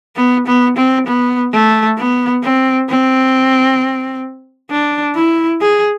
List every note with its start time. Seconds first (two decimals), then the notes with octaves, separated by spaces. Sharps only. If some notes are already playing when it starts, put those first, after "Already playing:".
0.16 B3
0.47 B3
0.77 C4
1.07 B3
1.53 A3
1.97 B3
2.43 C4
2.89 C4
4.71 D4
5.15 E4
5.61 G#4